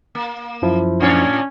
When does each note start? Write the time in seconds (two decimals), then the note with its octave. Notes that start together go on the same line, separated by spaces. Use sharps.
0.15 A#3
0.62 F#2 F3 E4
1.00 A2 C#4 D4 C#5